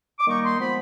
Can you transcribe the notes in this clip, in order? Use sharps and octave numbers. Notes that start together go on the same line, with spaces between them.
D6
D#3 G3 A#3 D#4 C#6
C6
F3 G#3 B3 B5